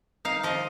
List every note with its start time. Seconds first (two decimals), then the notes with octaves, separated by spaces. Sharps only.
0.25 D#4 F5
0.43 F3 D#5